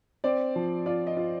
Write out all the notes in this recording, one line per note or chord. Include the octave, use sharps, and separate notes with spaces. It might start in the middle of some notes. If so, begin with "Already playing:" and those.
C4 D5
F3
F4 D5
D#5
F4